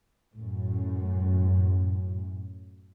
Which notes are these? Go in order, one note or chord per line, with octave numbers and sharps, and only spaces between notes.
F#2 A2